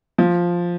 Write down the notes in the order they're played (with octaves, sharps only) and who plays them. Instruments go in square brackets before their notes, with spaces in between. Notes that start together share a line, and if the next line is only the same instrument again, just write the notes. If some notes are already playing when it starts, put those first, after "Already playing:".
[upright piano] F3